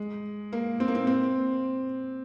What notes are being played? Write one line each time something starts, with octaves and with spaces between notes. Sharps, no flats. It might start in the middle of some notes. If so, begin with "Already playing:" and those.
Already playing: G#3
A#3
C4
A#3
C4
C4